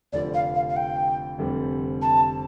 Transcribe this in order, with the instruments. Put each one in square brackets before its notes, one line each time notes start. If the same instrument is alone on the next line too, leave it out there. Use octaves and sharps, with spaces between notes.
[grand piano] F1 F2 D3 F3 [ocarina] D5
[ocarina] F5
F5
F5
G5
[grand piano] F1 F2 D3 G3 C4
[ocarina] A5